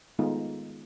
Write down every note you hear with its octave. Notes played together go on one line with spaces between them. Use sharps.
D#3 G#3 A3 B3 D#4 F4